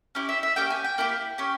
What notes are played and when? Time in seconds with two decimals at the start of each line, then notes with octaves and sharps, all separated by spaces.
0.15 C#4 E4 G4
0.29 E5
0.43 E5
0.56 A#3 C#4 G4 G5
0.70 G#5
0.84 G5
0.98 A#3 E4 G4
1.38 C#4 G4